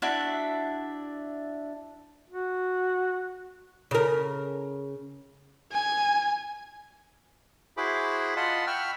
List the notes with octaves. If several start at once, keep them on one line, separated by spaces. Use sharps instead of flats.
D4 E4 F#4 E5
F#4
C#3 A#4
G#5
E4 F#4 G#4 C5 B5 D6
F4 D#5 F#5 A5 B5 C6
F#5 G5 B5 C#6 E6 F6